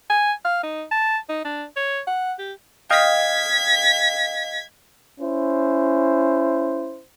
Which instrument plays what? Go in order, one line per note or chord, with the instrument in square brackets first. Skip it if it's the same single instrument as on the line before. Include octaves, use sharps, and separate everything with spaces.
[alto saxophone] G#5
F5
D#4
A5
D#4
D4
C#5
F#5
G4
[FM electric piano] D#5 F5 G5 [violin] G#6 B6
[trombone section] C#4 E4 C5